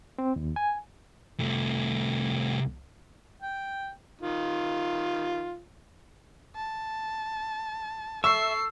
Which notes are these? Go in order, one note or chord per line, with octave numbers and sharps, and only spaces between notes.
C4
D#2
G#5
C2 A3
G5
D#3 F4
A5
A4 E5 C#6 E6 C7